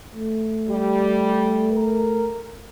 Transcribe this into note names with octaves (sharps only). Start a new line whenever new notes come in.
A3
G3
A#4